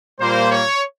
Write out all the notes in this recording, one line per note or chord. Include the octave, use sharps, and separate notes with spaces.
A#2 G3 A#3 C5
C#5